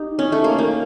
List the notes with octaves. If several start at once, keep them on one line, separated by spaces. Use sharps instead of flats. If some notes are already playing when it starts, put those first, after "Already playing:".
Already playing: D#4 G4
C#4
A3
A#3
A#3